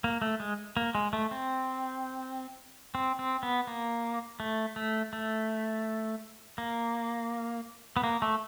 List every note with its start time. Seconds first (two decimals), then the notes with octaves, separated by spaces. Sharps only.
0.04 A#3
0.22 A3
0.40 G#3
0.77 A#3
0.95 G#3
1.13 A3
1.31 C4
2.95 C4
3.19 C4
3.43 B3
3.67 A#3
4.40 A3
4.76 A3
5.13 A3
6.58 A#3
7.97 B3
8.04 A#3
8.22 A3